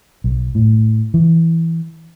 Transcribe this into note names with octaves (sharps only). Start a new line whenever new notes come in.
B1
A2
E3